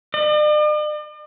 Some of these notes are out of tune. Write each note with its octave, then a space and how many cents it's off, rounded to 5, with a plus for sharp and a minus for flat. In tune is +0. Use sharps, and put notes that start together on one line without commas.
D5 +45